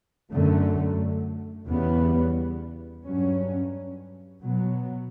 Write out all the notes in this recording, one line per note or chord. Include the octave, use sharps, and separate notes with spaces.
F#2 D3 A3
E2 C#3 E3 G3 B3
G2 F#3 C#4
B2 F#3 B3